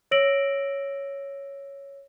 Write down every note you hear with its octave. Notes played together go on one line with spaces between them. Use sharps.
C#5 E6 A#6 D7 F#7